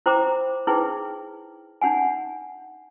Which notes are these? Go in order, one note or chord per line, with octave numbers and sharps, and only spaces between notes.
E4 C5 G5 A#5 B5 D6
D#4 E4 G#4 B4 G5
D4 D#4 F#5 G#5